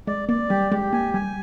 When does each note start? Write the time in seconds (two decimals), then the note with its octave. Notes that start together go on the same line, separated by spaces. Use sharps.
0.07 G#3 D5
0.29 A#3 D5
0.50 G3 G4
0.72 G#3 G4
0.93 A#3 G#5
1.14 G3 G#5